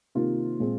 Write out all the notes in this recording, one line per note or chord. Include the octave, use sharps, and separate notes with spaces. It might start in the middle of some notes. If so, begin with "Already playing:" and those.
C3 D#3 A#3 F4
A#2 G#3 C4